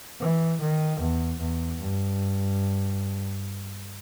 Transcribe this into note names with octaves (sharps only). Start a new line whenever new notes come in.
E3
D#3
E2
E2
G2